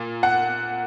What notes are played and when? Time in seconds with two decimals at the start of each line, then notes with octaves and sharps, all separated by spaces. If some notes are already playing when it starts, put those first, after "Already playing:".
Already playing: A#2
0.23 F#5